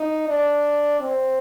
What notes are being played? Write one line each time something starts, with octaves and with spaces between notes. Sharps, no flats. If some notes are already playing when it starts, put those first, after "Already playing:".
Already playing: D#4
D4
C4